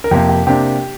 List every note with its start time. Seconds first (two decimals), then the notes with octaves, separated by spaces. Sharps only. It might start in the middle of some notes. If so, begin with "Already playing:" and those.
0.04 A#4
0.11 F2 C3 A#3 G4
0.29 G4
0.47 C3 A#3 D4 G4